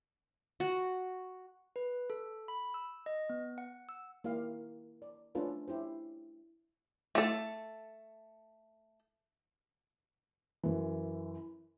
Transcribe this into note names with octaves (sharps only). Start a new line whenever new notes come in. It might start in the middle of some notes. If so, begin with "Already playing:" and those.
F#4
B4
A4
B5
E6
D#5
B3
F#5
E6
A#3 E4 G4 F5
D5
A3 C#4 D4 F4 A4 B4
C#4 E4 G4 C5
A3 A4
F#2 E3